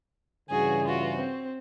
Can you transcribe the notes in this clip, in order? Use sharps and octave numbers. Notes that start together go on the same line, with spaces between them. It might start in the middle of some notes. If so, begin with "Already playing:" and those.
G2 C#3 E3 F#4 G#4
F4 F#4
C4